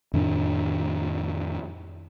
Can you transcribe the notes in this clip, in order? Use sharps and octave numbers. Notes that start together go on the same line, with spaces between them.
F2 A2 D#3 D4